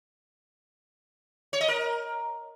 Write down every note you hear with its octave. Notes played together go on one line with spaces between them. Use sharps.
C#5
D#5
A#4